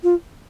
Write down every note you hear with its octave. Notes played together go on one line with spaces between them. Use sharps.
F4